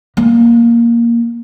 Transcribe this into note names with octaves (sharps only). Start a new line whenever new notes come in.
A#3